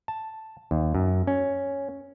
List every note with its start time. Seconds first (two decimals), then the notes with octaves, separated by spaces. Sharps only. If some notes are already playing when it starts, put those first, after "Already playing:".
0.08 A5
0.71 D#2
0.95 F#2
1.27 C#4